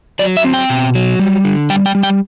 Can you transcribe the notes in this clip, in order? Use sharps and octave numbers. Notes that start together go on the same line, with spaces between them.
F#3 D5
E5
C4
G5
B2
F#3
G3
D3
G3 G5
G5
G3
G5